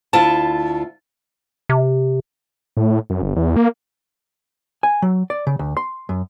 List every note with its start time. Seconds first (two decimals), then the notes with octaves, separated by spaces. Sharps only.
0.13 D2 E4 F4 A5
1.69 C3
2.77 A2
3.10 F#2
3.22 G1
3.36 E2
3.56 A#3
4.83 G#5
5.02 F#3
5.30 D5
5.47 C#3
5.59 D2
5.77 C6
6.09 F#2